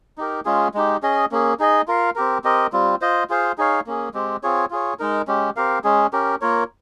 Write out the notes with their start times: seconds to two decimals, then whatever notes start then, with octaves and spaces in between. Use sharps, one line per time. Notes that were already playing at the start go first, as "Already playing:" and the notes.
0.18 D#4 G4 A#4
0.45 G#3 C#4 F4 G#4
0.74 G#3 D#4 G4
1.03 C#4 G#4 D#5
1.31 A#3 C#4 G#4
1.60 D#4 G#4 D#5
1.88 F4 A#4 F5
2.16 C4 G4 A#4
2.44 C4 G4 A#4 D#5
2.73 G3 C4 F4
3.01 F4 C5 D#5
3.30 F4 G#4 C5 F5
3.58 D#4 G#4 C#5 F5
3.87 A#3 C#4 G#4
4.14 G#3 C4 G4
4.43 C4 F4 G#4 C#5
4.70 F4 G#4 C#5
4.99 G#3 D#4 A#4
5.28 G#3 C#4 G4
5.56 C4 G4 A#4 F5
5.84 G#3 C#4 G#4
6.13 C#4 G4 A#4
6.41 A#3 F4 A#4 C#5